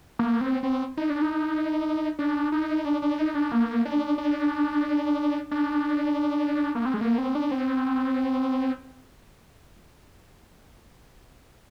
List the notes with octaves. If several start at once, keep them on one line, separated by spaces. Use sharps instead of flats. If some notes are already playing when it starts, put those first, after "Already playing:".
A#3
C4
C4
D#4
D4
D#4
D4
D#4
D4
D4
D#4
D4
A#3
D4
D4
D4
A#3
C4
G#3
A#3
C4
D4
C4